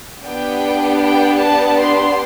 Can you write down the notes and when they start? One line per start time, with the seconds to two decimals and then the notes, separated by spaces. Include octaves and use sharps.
0.24 B3 D4 G4 G5
1.01 G5
1.40 A5
1.79 C6